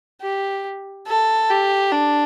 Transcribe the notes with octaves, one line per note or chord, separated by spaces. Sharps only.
G4
A4
G4
D4